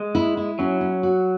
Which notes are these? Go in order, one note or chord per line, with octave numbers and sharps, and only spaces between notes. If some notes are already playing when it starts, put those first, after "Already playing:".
Already playing: G#3
E4
E4
F#3 C#4
C#4
F#4